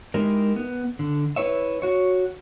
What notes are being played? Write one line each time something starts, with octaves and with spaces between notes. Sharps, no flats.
G#3 D#4 E4 G4 A#4
B3
D3
E4 B4 C#5 E5
F#4 C#5